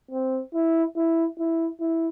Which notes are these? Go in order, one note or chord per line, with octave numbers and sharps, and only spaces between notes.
C4
E4
E4
E4
E4